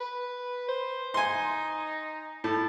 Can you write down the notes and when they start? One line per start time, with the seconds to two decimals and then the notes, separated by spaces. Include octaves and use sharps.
0.01 B4
0.69 C5
1.14 D#4 G#5 C6
2.44 A2 A5